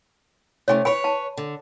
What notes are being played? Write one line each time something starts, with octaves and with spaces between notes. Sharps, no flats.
C3 A3 C#4 C#5 G#5
B4 C#5 G#5 B5
A5
D3